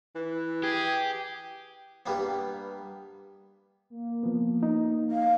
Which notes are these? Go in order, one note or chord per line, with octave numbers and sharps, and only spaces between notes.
E3
G4 G#4
G2 G3 A#3 B3
A#3
F3 B3
D#4
F5